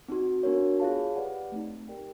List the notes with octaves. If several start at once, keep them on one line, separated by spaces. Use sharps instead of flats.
C4 D#4 F#4
B3 D4 F#4 A#4 C#5
F4 G#4 C#5 F5 A5
G4 B4 D5 F#5
A3 C4 D#4
G4 A#4 D5 G5